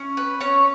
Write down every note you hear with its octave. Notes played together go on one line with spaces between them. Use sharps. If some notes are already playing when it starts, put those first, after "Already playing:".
Already playing: C#4
B4
C#4 C#5